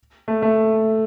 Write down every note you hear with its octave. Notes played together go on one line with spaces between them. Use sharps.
A3
A3